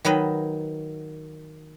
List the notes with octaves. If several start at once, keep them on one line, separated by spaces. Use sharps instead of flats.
D#3 F#3 B4 D#5